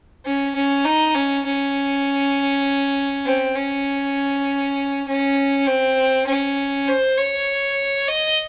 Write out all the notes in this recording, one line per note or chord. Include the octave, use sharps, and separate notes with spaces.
C#4
C#4
D#4
C#4
C#4
C4
C#4
C#4
C4
C#4
C5
C#5
D#5